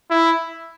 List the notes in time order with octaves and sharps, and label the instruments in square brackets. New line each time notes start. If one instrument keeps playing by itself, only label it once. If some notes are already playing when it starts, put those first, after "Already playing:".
[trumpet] E4